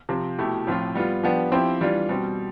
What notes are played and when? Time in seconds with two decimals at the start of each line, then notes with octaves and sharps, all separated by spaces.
0.09 C3 F3 C4
0.38 B2 A3 E4 G4
0.67 A2 F3 C4 F4
0.95 G3 B3 F4
1.23 F3 B3 D4 G4
1.52 F3 C4 E4 G4
1.81 E3 G3 D4 F4
2.09 B2 G3 C4